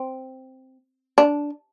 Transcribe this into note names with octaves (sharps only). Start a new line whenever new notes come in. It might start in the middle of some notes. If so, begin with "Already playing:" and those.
Already playing: C4
D4